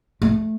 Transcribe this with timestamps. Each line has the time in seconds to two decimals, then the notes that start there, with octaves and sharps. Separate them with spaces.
0.22 A3